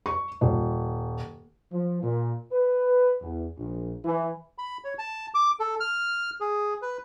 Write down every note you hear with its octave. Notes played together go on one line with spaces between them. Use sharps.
C#6
D#1
F3
A#2
B4
E2
A#1
E3
B5
C#5
A5
D6
A4
F6
G#4
B4